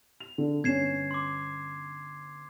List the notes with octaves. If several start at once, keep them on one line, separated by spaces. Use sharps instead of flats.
F7
D3
G1 C#4 G#6 C7 E7
C6 D6